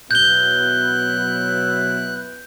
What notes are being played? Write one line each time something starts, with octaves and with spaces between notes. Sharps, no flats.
B2 F#3 B3 E4 F#6 G6 G7